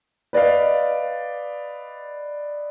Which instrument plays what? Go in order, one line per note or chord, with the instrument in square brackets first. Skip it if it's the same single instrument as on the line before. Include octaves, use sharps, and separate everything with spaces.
[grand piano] B4 D5 D#5 F5